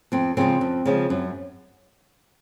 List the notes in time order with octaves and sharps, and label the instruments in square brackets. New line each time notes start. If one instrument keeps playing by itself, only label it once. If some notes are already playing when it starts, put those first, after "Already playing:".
[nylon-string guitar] F2 C4
C#3 F3 G#3 C4
F2
C#3 F3 G#3
F#2